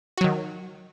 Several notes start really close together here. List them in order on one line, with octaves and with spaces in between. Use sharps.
F#4 F#3 D#3